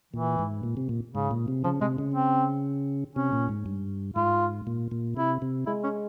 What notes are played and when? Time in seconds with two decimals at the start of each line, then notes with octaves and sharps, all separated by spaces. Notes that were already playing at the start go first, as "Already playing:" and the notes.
0.14 A#2 E3
0.39 G#2
0.63 A#2
0.77 C3
0.89 A#2
1.15 G#2 C#3
1.31 A#2
1.48 C3
1.64 C#3 F3
1.81 C3 G#3
1.98 C#3
2.14 C4
3.16 C3 C#4
3.33 A#2
3.49 G#2
3.66 G2
4.16 G#2 F4
4.67 A#2
4.92 A#2
5.17 C3 E4
5.42 C3
5.67 G#3 E4
5.84 C#4